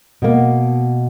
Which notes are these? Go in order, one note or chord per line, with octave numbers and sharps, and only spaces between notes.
B2 A#3